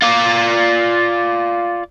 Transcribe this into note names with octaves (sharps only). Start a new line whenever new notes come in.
F4 D5